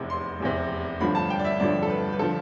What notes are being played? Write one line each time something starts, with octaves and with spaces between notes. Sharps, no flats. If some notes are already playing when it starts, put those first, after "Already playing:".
Already playing: F1 E2 C3
C6
F1 E2 C3
A1 G2 D3 F3 B5
A5
G5
D5
E5
A1 G2 D3 F3 D5
A4
B4
B4
D3 F3 A4